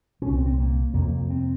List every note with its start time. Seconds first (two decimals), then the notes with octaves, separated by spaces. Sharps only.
0.22 C2 A#2 C#4
0.34 C4
0.46 C4
0.58 A#3
0.94 F2 C3 A#3
1.30 C4